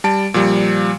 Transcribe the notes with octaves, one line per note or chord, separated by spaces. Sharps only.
G3 A5 D7
A#2 F3 G3